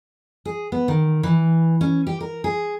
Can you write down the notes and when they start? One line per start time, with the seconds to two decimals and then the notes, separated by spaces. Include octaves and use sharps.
0.45 G#4
0.72 B3
0.88 D#3
1.23 E3
1.81 C#4
2.07 G4
2.20 A#4
2.44 G#4